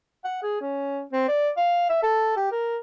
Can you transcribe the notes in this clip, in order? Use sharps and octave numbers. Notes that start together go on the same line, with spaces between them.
F#5
G#4
C#4
C4
D5
F5
E5
A4
G4
A#4